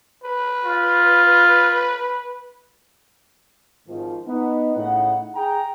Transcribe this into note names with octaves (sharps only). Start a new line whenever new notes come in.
B4
F4
G#1 G#2 D#3 F3
B3 D#4
A2 C#3 D#4 E4 F#5
G#4 G5 A#5